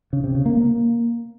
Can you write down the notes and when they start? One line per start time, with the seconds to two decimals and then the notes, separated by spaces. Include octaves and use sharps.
0.13 C#3
0.24 C3
0.35 C#3
0.46 A#3
0.57 A#3